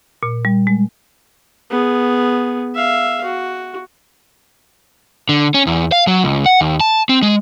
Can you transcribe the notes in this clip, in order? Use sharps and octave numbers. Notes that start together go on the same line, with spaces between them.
A#2
G3
G#3
B3 G#4
E5 F5
F#4
D3
C#4
E2
F5
F#3
C#2
F#5
D#2
A5
C4
G#3